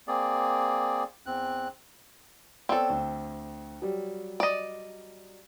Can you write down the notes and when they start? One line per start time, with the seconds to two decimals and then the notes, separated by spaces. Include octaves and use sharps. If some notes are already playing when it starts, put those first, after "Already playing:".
0.08 A#3 C4 G#4 D5
1.26 E2 C4 F#6
2.69 B3 C4 A4 C#5 D5
2.90 D2
3.82 F#3 G3
4.40 D5 D#5